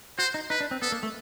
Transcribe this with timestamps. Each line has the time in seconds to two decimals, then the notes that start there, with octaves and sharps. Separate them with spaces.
0.18 F#4 C5
0.34 D#4
0.50 D#4 B4
0.61 D4
0.71 C4
0.82 B3 A4
0.92 A#3
1.03 A3